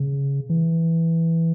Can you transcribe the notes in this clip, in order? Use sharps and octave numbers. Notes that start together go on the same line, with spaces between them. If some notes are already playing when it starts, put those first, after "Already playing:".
Already playing: C#3
E3